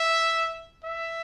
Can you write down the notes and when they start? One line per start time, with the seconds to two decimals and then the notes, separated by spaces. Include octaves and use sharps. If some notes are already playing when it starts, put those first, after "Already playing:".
Already playing: E5
0.84 E5